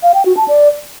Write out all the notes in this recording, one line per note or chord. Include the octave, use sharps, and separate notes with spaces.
F5
G5
F#4
A5
D5